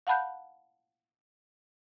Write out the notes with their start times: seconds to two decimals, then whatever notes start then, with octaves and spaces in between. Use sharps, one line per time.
0.07 F5 F#5 A5 B5 F#6 G6